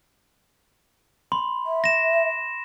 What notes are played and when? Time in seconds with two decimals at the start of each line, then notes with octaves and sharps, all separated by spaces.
1.32 B5 C6
1.66 E5
1.84 A#6 E7